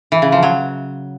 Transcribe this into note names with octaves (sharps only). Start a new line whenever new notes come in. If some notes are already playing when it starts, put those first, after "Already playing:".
E3
C#3
F3
F#3